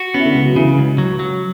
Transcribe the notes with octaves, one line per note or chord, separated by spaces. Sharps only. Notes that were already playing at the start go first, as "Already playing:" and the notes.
Already playing: F#4
B3 C#4
E4
D3 D4
C#2
F#3 F#4
C#3 E3 E4
C#2
F#3
F#3